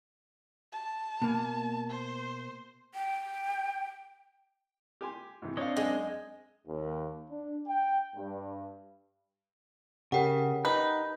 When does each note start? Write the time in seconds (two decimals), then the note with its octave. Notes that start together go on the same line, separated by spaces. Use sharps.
0.72 A5
1.22 B2 A#3
1.90 C5
2.95 G5
5.01 G4 G#5 C6
5.42 G#2 C3 E3
5.57 C4 D4 C#5 D#5 F5
5.77 F#2 G#3
6.67 D#2
7.29 D4
7.66 G5
8.15 G2
10.12 C#3 G4 A#4 F#5 G5
10.65 D#4 B4